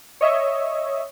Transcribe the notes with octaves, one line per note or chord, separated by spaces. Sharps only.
C#5 D#5 E5